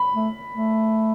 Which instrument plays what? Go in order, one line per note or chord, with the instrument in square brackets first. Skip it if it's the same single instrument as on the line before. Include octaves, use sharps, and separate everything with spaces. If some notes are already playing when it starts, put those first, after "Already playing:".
Already playing: [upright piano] B5
[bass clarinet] A3
A3